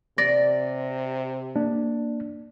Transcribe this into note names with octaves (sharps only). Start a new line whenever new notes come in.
C3 D5 A#6
A#3 D4